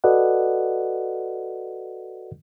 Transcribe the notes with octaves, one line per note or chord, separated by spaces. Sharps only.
F#4 A4 B4 D5 D#5 F#5